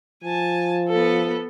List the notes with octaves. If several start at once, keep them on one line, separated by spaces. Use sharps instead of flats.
F3 G#5 A5
B3 A4